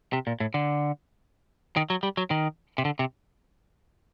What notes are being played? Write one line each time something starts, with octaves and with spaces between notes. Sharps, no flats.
C3
A#2
A2
D3
D#3
F#3
G3
F#3
D#3
C3
D3
C3